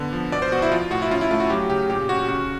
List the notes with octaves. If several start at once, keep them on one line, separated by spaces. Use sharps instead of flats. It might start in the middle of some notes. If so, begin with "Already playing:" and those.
Already playing: D3 B3
F3
B2 D5
C5
B2 F#4
E4
F3 F4
A2 F#4
E4
C#4 F4
E4
A3 F4
F#4
F#3 G4
C#3 G4
A#2 G4
C#4 F#4
C#3 F#4